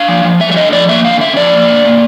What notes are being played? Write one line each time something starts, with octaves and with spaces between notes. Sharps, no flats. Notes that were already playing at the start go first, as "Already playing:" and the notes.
Already playing: D4 F5
F3
F3
A3 E5
E5
D4 D#5
F3 D5
A#3 E5
D3 F5
C#4 E5
F3 D5
A#3
D3
A#3